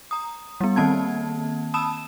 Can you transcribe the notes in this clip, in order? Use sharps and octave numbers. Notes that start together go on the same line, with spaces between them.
A#5 D#6
G3 B3
D#3 A#3 C4 A5 G#6
A5 B5 D#6 E6 E7